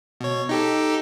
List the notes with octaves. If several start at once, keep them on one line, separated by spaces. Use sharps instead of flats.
B2 C#5
D#4 G4 A4